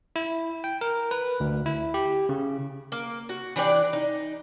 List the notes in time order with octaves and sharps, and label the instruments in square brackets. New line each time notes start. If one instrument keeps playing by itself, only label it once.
[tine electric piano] E4
G5
A#4
B4
D2
E4
G4
C#3
[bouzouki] A#3
F#4
E3 D4 G4 D5
D#4